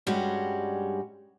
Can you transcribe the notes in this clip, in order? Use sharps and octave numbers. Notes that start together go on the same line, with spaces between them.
G2 G3 G#3 C#4 F#4 G4